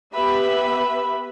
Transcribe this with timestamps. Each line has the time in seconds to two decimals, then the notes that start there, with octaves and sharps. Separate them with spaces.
0.13 B3 G4 B4 E5 B5